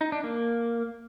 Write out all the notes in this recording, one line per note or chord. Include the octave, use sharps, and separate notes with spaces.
D#4
D4
A#3